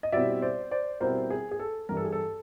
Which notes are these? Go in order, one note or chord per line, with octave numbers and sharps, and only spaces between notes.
D#5
B2 G3 C4 E4 D5 E5
C5 D5
C5 D5
B2 G3 C4 E4 A#4 C5
G#4
G#4
A4
G2 E3 G3 A#4
A4
G#4
A4